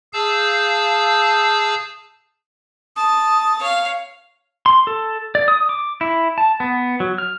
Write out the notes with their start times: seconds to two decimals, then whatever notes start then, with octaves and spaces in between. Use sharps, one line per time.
0.13 G#4 F5 A5 E6 G6
2.96 A5 D#6
3.59 C#5 F5
4.66 C6
4.87 A4
5.35 D5
5.48 D#6
5.69 D6
6.01 E4
6.38 A5
6.60 B3
7.00 F#3
7.18 F6